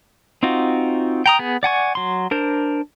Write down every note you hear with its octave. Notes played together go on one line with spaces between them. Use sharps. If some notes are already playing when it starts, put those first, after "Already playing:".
C4 D#4 F4 F#4
G5 A#5 D#6
B3 G#4
D5 F#5 G#5 C#6
F#3 C6
D4 A#4 C5